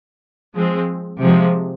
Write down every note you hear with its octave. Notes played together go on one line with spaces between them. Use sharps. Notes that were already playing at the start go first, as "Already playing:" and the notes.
F3 G#3 C4
C3 F3 G#3